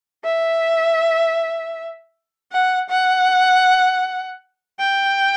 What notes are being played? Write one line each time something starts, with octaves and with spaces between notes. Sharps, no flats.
E5
F#5
F#5
G5